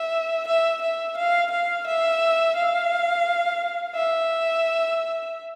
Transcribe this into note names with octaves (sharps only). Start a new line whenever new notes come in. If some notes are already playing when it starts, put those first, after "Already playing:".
Already playing: E5
E5
E5
F5
F5
E5
F5
E5